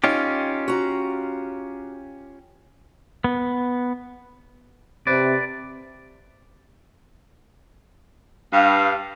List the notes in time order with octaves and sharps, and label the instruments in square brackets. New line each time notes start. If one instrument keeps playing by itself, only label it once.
[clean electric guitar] C#4 F4 G4 [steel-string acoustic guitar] D#4
[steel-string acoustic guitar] F#4 A#5
[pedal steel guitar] B3
[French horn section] C3 [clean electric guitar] B4 D5
[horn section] G2 F5